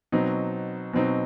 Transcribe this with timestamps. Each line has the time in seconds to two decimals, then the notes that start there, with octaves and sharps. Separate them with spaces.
0.12 B2 F#3 C4 D#4
0.93 B2 F#3 C4 D#4